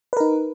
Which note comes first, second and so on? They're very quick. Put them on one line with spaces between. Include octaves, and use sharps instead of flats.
B4 A#4 D#4